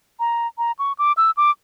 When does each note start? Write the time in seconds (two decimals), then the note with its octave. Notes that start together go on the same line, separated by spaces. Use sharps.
0.20 A#5
0.58 A#5
0.79 C#6
0.99 D6
1.17 E6
1.37 D6